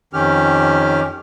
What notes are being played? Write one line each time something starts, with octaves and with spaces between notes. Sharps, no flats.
F2 D#3 C#4 G4 F6